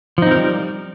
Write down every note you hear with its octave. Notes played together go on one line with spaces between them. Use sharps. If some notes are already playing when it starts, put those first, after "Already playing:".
F3 G3 C4 D#4 A#4